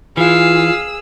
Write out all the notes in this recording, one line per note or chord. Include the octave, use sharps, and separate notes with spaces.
E3 F4 G#4 F5 E6